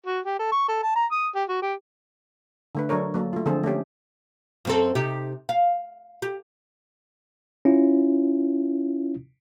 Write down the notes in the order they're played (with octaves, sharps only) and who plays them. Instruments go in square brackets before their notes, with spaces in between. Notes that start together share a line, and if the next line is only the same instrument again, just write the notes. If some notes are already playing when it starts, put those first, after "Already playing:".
[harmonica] F#4
G4
A4
C#6
A4
A5
A#5
D#6
G4
F#4
G4
[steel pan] D3 A3 B4
F#3 D4 A4 A#4 C#5
F#3 A#3 A4
A3 F4
D3 F3 C4 G#4 A4 C5
A3 A#3 C#4 G4
[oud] F#2 C4 A4
C3 D#4 G4
F5
G4
[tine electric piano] C#4 E4 F4